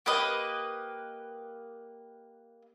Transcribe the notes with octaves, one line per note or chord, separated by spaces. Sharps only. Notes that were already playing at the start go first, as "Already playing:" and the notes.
A#3 G4 B4 D#5